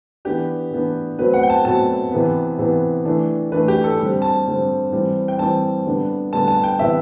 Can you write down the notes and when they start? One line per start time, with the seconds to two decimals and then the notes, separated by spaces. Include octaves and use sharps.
0.25 E3 B3 D4 G4
0.71 E3 B3 D4
1.18 B2 F#3 A3 C4 B4
1.34 F#5
1.43 G5
1.50 A5
1.65 B2 F#3 A3 C4 A5
2.12 C3 E3 B3
2.58 C3 E3 B3
3.05 E3 A3 D4
3.52 E3 A3 D4 B4
3.68 G4
3.84 A4
3.99 D3 G3 C4
4.22 A5
4.46 D3 G3 C4
4.92 E3 G3 C4
5.28 G5
5.39 E3 G3 C4 A5
5.86 D3 G3 B3 D4
6.33 D3 G3 B3 D4 A5
6.48 A5
6.64 G5
6.79 C3 E3 B3 E5